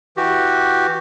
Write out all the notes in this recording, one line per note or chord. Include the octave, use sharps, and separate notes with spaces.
E3 F#4 G4